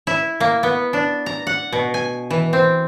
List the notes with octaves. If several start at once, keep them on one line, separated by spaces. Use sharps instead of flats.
E4
A#3
B3
D4
A#5
F#5
B2
G#5
E3
C4